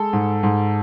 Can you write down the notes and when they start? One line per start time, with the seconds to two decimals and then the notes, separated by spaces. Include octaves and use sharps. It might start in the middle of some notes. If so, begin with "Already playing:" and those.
Already playing: G#3 A4
0.13 G#2
0.43 G#2